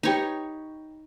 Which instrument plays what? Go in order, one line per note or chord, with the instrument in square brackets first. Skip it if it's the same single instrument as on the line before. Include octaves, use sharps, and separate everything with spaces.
[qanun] D#4 C#5 [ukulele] G4 B4